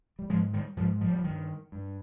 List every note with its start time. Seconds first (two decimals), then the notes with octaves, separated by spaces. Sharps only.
0.19 G3
0.29 G#2 F3 G#3
0.53 D#3 G3
0.77 G#2 F3
1.01 F3
1.08 G3
1.16 F3
1.24 G2 D#3
1.72 G2